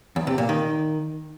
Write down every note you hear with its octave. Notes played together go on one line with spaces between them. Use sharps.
E2
C3
A#2
D#3